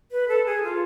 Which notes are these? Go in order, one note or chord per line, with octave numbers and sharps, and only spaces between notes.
B4
A4
G#4
F4